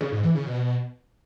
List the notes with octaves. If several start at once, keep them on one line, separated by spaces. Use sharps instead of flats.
C#3
G#2
E3
C#3
B2